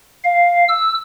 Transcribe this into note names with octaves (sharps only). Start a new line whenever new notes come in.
F5
E6